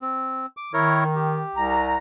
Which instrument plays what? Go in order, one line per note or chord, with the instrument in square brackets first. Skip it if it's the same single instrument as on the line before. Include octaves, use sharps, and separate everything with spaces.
[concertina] C4
D6
[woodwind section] D#3 [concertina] E4 A#4 C#5
[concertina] G4
[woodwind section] C2 A#5